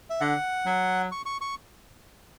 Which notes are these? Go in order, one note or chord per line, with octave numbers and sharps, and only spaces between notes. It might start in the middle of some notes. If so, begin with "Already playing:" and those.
E5
D3 F#5
F#3
C#6
C#6
C#6